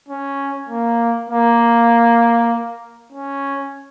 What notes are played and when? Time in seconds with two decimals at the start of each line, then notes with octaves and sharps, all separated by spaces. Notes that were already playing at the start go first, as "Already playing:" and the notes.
0.09 C#4
0.69 A#3
1.30 A#3
3.13 C#4